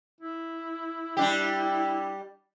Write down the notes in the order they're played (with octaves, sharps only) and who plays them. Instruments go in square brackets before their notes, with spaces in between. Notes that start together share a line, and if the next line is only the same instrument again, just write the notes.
[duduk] E4
[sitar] G3 D4 G4